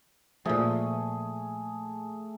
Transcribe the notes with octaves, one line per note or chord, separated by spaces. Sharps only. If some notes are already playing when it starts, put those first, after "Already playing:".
A#2 F3 A3 G#4